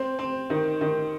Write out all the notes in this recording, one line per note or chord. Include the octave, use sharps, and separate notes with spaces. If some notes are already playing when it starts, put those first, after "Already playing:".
Already playing: C4
C4
D#3
D#3